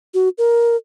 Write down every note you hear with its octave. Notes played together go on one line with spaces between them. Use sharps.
F#4
A#4